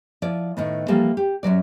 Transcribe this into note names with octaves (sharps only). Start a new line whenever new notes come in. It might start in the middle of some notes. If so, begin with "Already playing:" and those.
F3 E4 D5
A2 D#3 B3
E3 F3 G3 A#3 A4
G4
F#2 A#2 F#3 D5